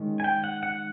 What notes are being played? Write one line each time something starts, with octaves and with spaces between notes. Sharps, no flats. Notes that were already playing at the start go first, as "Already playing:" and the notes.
Already playing: D#3 G#3 C#4
G#5
G5
F#5
F#5